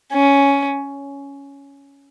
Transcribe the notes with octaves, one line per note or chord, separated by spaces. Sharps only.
C#4